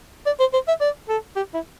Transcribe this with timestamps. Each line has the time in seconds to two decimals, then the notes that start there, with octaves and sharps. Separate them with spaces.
0.26 D5
0.40 C5
0.53 C5
0.68 E5
0.81 D5
1.09 A4
1.36 G4
1.54 E4